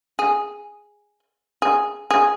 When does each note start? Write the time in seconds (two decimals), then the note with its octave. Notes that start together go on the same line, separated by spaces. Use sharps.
0.19 G#4
1.62 G#4
2.11 G#4